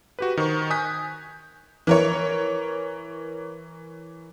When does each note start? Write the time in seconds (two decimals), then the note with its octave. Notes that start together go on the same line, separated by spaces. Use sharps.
0.19 F#4 G4 B4
0.37 D#3 C5 C#6
0.70 G#5 D#6 F#6 G6 B6
1.87 E3 A#4 C#5